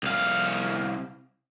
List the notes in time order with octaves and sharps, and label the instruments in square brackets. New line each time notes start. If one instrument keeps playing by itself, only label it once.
[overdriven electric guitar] C2 F5